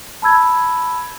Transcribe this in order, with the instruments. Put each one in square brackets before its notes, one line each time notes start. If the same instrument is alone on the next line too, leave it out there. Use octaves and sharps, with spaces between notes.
[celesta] A5 B5 E6 G#6